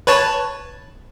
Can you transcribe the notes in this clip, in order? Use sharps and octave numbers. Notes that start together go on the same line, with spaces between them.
B4 C#5 A5